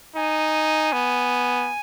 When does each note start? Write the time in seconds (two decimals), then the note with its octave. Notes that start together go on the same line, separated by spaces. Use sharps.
0.16 D#4 G#5
0.93 B3